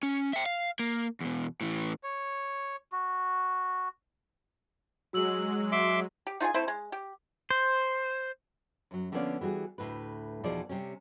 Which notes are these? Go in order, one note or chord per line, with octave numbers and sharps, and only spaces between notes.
C#4
E5 G5
F5
A#3
E2 B2
A2 E3
C#5
F#4
F#3 G#3 F#4 E6 F#7
E5 C6 D6
G4
D#4 F4 G#4 G#5
A3 C4 E4 C5
G#3
G4
C5
F#2 F#3
D3 F3 A#3 B3 C#4 D5
E3 G3 F#4 G#4
D2 A2 B4
E2 B2 F3 D#4 G#4 D5
C3 G3 C#4